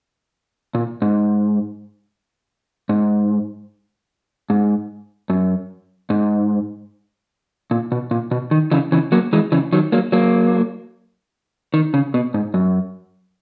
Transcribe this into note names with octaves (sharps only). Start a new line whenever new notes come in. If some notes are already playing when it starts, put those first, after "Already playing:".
A#2
G#2
G#2
G#2
F#2
G#2
A#2
B2
A#2
B2
D#3
C#3 E3
C#3 E3
F#3 A#3
E3 G#3
C#3 E3
D#3 F#3
F#3 A#3
F#3 A#3
D#3
C#3
B2
G#2
F#2